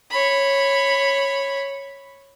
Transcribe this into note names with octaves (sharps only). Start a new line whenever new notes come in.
C#5 B5